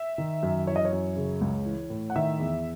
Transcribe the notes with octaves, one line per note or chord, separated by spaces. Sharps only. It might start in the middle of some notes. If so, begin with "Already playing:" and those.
Already playing: E5
D#3
F#2
E3 C#5
D#5
C#5
F#2
C#3
C#2
E3
A2
F#5
D#3 E5
E2